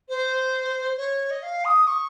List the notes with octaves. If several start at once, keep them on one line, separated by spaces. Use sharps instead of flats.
C5
C#5
D#5
F5
D#6
C#6